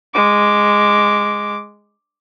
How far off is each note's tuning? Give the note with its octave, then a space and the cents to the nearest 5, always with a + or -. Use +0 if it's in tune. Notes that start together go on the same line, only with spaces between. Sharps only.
G#3 -5 D6 +0